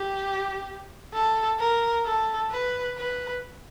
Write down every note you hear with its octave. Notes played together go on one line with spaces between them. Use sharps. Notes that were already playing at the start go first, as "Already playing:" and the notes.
Already playing: G4
A4
A#4
A4
B4
B4